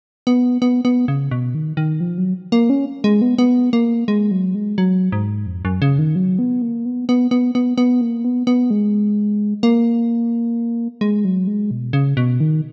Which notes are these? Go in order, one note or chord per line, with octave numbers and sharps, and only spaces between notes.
B3
B3
B3
C#3
B2
D#3
D#3
F3
F#3
A#3
C#4
G#3
B3
B3
A#3
G#3
F#3
G#3
F#3
G#2
F2
F#2
C#3
D#3
F#3
B3
A#3
B3
B3
B3
B3
B3
A#3
B3
B3
G#3
A#3
G#3
F#3
G#3
B2
C#3
B2
D#3